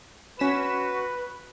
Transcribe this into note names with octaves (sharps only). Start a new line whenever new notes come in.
C#4 F#4 B4 B6 E7